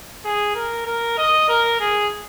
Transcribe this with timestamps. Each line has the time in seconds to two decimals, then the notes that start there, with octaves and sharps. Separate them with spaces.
0.25 G#4
0.56 A#4
0.86 A#4
1.18 D#5
1.49 A#4
1.80 G#4